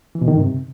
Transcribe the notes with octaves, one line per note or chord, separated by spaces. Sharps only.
E3
B2
D#3
G2
C3